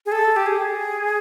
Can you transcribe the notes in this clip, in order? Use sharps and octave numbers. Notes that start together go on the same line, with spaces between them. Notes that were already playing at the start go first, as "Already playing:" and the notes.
G#4
A4
G4
G#4